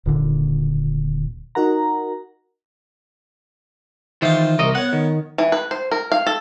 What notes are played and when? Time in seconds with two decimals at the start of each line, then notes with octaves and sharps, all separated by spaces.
0.06 D#1 A#2 D3
1.55 D#4 F#4 A#4 F#5 A#5
4.22 D#3 E3 F4 C5
4.59 C2 A#4 D#5
4.75 B3 C#5 F#5
4.93 D#3
5.38 E3
5.52 B4
5.71 C5
5.91 A#4
6.12 F5
6.26 A4